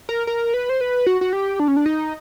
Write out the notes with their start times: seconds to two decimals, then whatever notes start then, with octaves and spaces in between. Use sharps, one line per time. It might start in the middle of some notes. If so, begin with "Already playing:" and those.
0.09 A#4
0.27 A#4
0.54 B4
0.69 C5
0.81 B4
1.06 F#4
1.21 F#4
1.33 G4
1.60 D4
1.68 C#4
1.76 D4
1.86 D#4